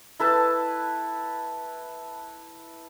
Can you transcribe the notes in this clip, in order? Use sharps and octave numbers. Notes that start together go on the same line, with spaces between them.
E4 A4 B4 A5